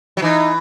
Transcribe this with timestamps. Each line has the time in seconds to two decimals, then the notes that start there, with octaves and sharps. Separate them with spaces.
0.17 F#3
0.22 E3 D#4